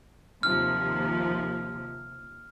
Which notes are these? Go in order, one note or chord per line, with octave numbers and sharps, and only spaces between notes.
D#2 C3 F3 F6